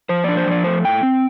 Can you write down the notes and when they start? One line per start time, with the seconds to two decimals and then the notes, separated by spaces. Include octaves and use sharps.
0.09 F3 C5
0.24 D4 D5
0.37 C5
0.47 F3 D5
0.64 A3 C5
0.85 A2 G5
1.03 C4